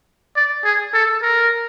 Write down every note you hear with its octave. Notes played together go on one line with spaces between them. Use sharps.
D5
G#4
A4
A#4